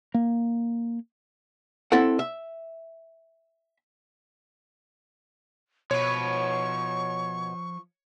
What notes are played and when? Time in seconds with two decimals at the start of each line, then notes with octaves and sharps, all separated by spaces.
0.14 A#3
1.92 C4 E4 A4 F#5
2.19 E5
5.91 B2 F3 B4 C#5 C#6